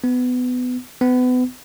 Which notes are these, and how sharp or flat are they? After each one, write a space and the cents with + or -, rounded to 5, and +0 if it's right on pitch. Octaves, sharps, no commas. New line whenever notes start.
B3 +20
B3 +30